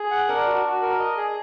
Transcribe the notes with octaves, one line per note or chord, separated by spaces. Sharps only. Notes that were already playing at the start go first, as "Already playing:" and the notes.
Already playing: G#4
F#5
D4 A#4
F#4
F#4
A#4
D#5
G#4